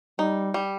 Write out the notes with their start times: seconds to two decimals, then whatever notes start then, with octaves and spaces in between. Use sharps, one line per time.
0.19 G3 D#4
0.54 G3